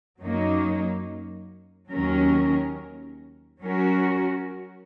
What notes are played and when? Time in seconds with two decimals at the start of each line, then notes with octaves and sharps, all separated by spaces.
0.21 F#2 F#3 A#3 D#4
1.91 D#2 D#3 F#3 C#4 A#4
3.61 F#3 C#4 F#4 A#4